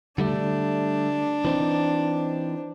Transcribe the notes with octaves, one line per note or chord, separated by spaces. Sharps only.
D3 G3 A3 D4
E3 C4 D#4